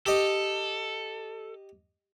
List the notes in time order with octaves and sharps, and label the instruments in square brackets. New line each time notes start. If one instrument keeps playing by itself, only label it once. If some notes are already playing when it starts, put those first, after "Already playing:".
[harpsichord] G4 D#5 [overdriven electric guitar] A4